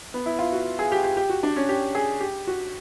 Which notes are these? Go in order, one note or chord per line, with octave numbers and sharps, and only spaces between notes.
B3
E4
F4
F#4
G#4
G4
G4
G4
F#4
D4
C#4
G4
G#4
G4
F#4